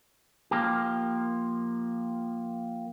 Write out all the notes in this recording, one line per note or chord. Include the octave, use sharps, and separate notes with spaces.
F3 A#3 G4